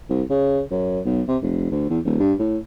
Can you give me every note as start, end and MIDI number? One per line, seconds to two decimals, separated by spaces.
0.10 0.22 36
0.30 0.61 49
0.71 1.00 42
1.05 1.22 35
1.28 1.37 48
1.42 1.69 29
1.71 1.89 38
1.90 1.99 40
2.05 2.17 27
2.19 2.33 43
2.39 2.58 45